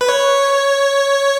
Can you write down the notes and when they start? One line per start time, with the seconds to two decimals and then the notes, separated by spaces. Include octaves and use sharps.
0.01 B4
0.09 C#5